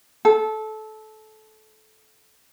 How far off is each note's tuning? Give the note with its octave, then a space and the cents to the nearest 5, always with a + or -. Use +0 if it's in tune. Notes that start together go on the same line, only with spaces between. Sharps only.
A4 -20